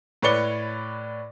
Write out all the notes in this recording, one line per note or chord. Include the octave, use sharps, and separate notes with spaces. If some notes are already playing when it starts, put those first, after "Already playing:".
A2 B4 C#5 D5 C#7 G7